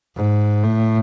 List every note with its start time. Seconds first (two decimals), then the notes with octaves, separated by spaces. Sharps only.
0.16 G#2
0.63 A2